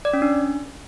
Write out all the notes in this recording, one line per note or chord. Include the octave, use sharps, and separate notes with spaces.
D5
C#4
D4